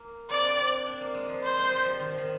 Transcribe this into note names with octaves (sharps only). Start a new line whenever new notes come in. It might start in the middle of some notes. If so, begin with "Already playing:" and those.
Already playing: A#3
C4 D5
D4
C4
D4
A#3
G#3
F3
C5
G#3
G3
F3
D#3
F3
D#3